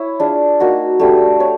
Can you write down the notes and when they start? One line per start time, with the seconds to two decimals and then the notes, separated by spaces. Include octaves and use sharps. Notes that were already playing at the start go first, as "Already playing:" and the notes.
Already playing: E4 C#5
0.20 D4 F4 G#4
0.60 A#3 D#4 F#4
1.00 A3 D4 G4 B4
1.40 C#5